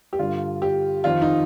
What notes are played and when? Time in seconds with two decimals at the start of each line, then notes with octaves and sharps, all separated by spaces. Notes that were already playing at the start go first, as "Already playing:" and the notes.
0.13 G4
0.19 G2 D3 F4
0.62 G4
1.04 F2 D#3 F4
1.22 D#4